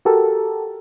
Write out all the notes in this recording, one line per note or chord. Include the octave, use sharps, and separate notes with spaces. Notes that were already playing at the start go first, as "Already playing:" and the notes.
F#4 G4 A4 A#4